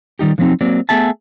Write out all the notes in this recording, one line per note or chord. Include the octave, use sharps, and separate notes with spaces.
D#3 G3 D#4 G4
D3 F3 F#3 B3 C4 D#4
F#3 A#3 C4 D5
A3 B3 G#4 E5 A5